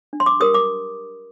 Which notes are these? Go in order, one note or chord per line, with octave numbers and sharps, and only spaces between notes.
D4
C6
D6
G4 A#4 D#6
D6